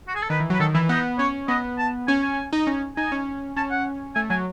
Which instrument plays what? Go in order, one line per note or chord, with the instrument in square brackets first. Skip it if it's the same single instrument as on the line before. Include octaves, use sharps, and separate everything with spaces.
[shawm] F#4
G#4
A4
[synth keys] D#3 [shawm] B4
[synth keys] E3
[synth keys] F#3 [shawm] B4
[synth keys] D#3 [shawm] A4
[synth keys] E3 [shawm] E4
[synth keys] B3 [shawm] D#4
[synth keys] C#4 [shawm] C#5
[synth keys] B3 [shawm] D#5
[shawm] A5
[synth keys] C#4 [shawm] G#5
[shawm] G#5
[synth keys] D#4
C#4
[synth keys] D#4 [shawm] G#5
[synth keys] C#4
[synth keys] C#4 [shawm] A5
[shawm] F#5
[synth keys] A3 [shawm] G#5
[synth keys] F#3 [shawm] G#5